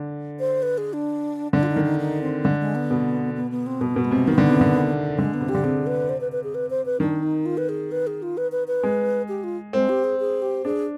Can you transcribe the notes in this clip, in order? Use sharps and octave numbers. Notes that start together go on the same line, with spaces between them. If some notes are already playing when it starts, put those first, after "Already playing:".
Already playing: D3
C5
B4
G#4
D4
D3 D4
F4
D#4
D#3
D#4
D#4
C4
D3 G#3
G#3
B3
B2
B3
B3
C4
B2 B3
B2
G#3
C3
D#3 B3
D3
C3
D3
D3 G#3
B3
C3
G4
D3
C3 G#4
B4
C5
B4
B4
G#4
B4
C5
B4
D#3 D4
D#4
F4
B4
G#4
B4
G#4
F4
B4
B4
B4
G#3
G4
F4
G#3 C4
G4
G#4
G#4
G4
D4 G#4